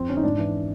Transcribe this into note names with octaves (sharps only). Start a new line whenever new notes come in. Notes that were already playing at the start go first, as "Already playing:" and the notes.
Already playing: F2 C4
D3 C#4
D#4
G#2 D4
E3